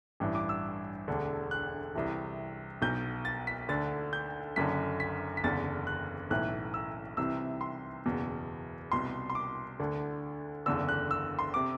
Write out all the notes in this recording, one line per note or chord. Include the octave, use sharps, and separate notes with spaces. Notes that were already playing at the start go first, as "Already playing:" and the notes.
A1 G2 E3
D6
E6
E1 D2 D3
F#6
C2 C3 E3
B1 B2 G6
A6
B6
D2 D3 A6
G6
F#1 F#2 D3 B6
B6
B6
F#1 E2 D3 A6
F#6
B1 A2 E3 F#6
E6
C2 C3 E3 E6
C6
F#1 E2 B2
C2 B2 C6
C6
D6
D2 D3
F#1 E2 D3 E6
F#6
E6
C6
C3 D6